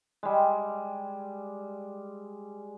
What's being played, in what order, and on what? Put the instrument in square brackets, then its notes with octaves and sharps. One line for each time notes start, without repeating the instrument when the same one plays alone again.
[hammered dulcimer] G3 G#3